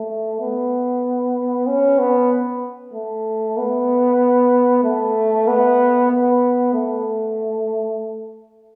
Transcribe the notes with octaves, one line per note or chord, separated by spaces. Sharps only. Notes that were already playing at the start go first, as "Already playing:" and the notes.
Already playing: A3
B3
C#4
B3
A3
B3
A3
B3
B3
A3